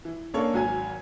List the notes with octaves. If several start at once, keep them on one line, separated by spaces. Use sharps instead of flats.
E3
A#3 C#4 D4 G#4 A4 C#5
G#1 F#3 G#5 G#6